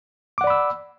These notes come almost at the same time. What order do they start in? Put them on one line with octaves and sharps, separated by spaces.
D6 F#5 D5 B5 E6